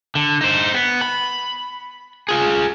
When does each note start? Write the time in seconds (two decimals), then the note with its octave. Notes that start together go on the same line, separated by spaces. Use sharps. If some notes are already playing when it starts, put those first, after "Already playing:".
0.15 D3
0.41 D#4 C5
0.74 B3
1.01 B5
2.29 F4 G#4